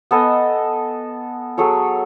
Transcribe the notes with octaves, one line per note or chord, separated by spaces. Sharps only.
B3 A4 D#5 G#5
F#3 G#4 A4 C#5